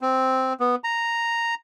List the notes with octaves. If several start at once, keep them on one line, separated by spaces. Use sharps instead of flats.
C4
B3
A#5